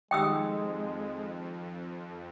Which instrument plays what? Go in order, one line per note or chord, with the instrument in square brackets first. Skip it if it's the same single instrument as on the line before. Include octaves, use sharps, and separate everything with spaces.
[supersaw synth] F2 [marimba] D#3 D#4 G4 [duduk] G#3 [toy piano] G5 D#6 E6